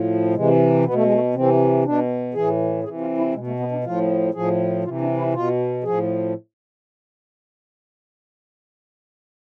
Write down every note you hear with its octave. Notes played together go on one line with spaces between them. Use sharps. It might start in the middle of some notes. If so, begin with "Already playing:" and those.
Already playing: A2 F3
C3 E3 G#3
B2 B3
A3
G#3
A3
C3 E3 C4
B2 D4
A2 E3 G#4
C3 E3 G#4
F4
E4
B2 G#3
A3
B3
D4
A2 F3 F4
A2 F3 G#4
C3 E3 F4
D4
E4
B2 F4
A2 F3 G#4